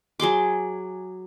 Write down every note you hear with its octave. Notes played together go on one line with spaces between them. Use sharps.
F#3 G#4 C6 D6